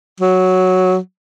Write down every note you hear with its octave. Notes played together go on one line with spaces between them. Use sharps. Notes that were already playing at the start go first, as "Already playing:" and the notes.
F#3